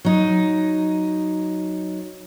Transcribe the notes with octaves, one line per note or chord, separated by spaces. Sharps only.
F#3 D#4